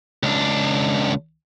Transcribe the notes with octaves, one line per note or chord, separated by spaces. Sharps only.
C#2 D4